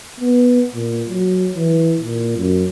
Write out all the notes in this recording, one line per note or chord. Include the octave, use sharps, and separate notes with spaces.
B3
A#2
F#3
E3
A#2
F#2